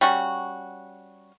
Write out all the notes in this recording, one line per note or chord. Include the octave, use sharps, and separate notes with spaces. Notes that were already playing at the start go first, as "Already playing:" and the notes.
G3 C#4 F#4